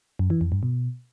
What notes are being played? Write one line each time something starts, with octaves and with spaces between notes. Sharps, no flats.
F#2
E3
F2
G2
B2